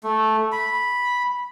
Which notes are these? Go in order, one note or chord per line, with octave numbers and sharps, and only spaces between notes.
A3
B5